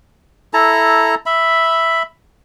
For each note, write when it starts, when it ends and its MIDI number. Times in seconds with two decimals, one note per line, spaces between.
0.54 1.15 64
0.54 1.15 69
0.54 1.15 81
0.54 1.15 82
1.26 2.03 76
1.26 2.03 83